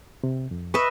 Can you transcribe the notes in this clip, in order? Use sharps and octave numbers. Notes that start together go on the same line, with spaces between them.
C3
F2
B4 D#5 E5 C#6